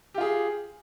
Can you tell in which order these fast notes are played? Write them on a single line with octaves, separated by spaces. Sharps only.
G4 F4 G#4